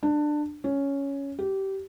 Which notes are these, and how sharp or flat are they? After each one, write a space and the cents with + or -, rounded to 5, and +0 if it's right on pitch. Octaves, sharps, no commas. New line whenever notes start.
D4 +20
C#4 +5
G4 -20